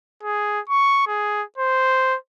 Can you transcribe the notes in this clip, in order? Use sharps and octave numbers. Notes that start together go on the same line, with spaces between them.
G#4
C#6
G#4
C5